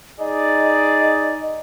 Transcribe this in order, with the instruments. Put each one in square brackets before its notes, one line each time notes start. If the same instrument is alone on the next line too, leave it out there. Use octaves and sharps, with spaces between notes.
[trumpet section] D#4 G#4 D5 [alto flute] D#5